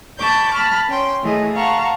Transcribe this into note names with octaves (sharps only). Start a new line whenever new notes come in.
A5 B5 C#6 D6 G6
A5 B5 F6
C#4 G5 C6
E3 A3 G#4 D#5
F5 F#5 A5 A#5 C#6